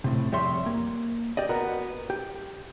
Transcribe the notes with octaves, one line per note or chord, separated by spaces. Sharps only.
A2 C3
F2 G3 C#5 E5 C6
A#3
G4 D5 D#5
B3 F#4 A#4
G4